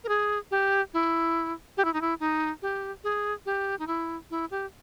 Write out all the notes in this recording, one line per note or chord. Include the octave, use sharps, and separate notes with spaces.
A#4
G#4
G4
E4
G4
E4
D#4
E4
D#4
G4
G#4
G4
D#4
E4
E4
G4